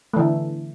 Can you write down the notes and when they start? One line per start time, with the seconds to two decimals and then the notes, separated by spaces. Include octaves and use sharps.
0.13 A3
0.16 E3
0.19 D3